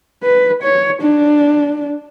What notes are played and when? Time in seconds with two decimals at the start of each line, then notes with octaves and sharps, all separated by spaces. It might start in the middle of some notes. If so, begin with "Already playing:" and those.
0.23 B4
0.63 C#5
1.02 D4